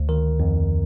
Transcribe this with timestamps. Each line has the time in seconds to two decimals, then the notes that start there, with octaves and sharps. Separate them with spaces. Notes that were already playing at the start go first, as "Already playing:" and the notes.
Already playing: D2
0.09 D#3 A#4
0.40 F2